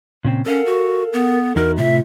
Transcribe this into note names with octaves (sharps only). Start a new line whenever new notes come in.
A#2 C#3 C4
C#4 A4 A#4 F5 F#5
F#4
B3
E2 D#4 F#4 A#4
A2 C3 A3 F4 E5